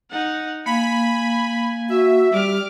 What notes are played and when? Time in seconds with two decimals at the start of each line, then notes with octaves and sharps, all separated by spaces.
0.11 D#4 F#5
0.66 A#3 F5 G#5 B5
1.90 F#4 E5
2.33 G3 D6 F6